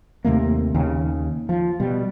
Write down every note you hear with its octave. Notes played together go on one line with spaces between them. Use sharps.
D#2 C3 A3 A#3
D#2 C#3
F3
B2 G3